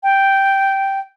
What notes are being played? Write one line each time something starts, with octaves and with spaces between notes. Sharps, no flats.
G5